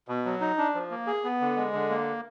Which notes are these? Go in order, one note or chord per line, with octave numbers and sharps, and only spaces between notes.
B2
F#3
D#4
D4
F3
A#3
G#4
B3
D3
G#3
D3
A#3